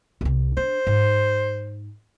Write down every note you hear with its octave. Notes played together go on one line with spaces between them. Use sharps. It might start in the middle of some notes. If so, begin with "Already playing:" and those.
C2 C3
D4 C5
G#2